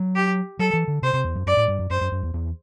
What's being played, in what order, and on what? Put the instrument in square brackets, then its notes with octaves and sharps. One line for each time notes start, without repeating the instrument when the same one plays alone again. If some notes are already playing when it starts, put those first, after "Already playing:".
Already playing: [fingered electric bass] F#3
[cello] G4
[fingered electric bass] F#3 [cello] A4
[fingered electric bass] E3
D3
[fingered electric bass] C3 [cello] C5
[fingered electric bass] C3
E2
F#2
[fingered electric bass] F#2 [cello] D5
[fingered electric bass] A2
G2
F#2
[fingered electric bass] F#2 [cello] C5
[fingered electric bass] F#2
F#2
E2
E2